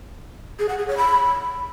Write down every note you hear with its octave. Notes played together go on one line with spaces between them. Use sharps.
G#4
F#5
G#4
C#5
B5